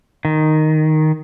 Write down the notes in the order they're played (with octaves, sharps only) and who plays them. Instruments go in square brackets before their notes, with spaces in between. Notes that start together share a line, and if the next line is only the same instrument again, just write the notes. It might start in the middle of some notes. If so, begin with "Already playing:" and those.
[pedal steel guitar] D#3